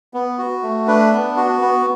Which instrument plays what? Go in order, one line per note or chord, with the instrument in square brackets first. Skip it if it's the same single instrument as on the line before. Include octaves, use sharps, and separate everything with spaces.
[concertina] B3
F#4
A3
D4 B4
B3
F#4
B3